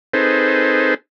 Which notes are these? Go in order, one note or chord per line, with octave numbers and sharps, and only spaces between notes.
C4 D#4 G#4 A4 B4 C5